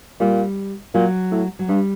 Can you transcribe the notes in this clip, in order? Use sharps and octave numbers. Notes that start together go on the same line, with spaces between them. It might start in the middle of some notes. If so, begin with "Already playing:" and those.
A#2 G3
A#2 F#3
A2
F#3
G2 G3